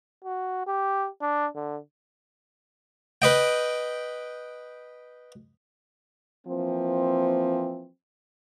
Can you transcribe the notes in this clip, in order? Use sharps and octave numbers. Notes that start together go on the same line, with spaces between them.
F#4
G4
D4
D3
B4 D#5 G5
E3 F3 A#3 C4